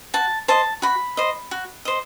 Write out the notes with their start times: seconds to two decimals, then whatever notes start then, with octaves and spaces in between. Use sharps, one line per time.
0.14 F#4 A5
0.48 C5 D#5 A5
0.82 F#4 B5
1.17 C5 D#5
1.51 F#4
1.85 C5 D#5